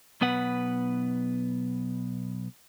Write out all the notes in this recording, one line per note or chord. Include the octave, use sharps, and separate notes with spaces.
B1 B3 B4 F#5